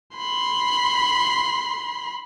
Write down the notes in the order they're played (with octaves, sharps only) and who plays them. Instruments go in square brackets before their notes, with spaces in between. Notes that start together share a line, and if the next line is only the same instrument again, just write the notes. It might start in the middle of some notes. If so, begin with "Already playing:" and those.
[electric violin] B5 C6